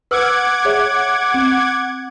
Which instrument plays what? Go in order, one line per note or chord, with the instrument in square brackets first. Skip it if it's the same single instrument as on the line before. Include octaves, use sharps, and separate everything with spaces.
[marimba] B4 E6 F6 [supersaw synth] F#5 D6 G#6
[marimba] G#4 C#5 E5
C4